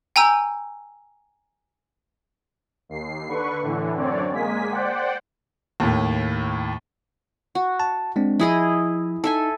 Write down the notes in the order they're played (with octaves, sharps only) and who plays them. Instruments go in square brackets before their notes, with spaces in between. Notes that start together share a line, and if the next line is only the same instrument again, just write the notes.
[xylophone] G5 G#5 A#5 E6 G6
[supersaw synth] D#2 C7
D3 B4 C#6
A2 D3 E3
F#2 D3 C4 C#5 D5
G#3 A#3 G#5 B6
C5 D5 F#5 G5
[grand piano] D#2 A2
[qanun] F#4
[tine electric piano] A5
G#3 C4 D4
[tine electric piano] F3 D#6 [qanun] E4 G#4 D#5
[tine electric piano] D#4 [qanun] A4 E5 G#5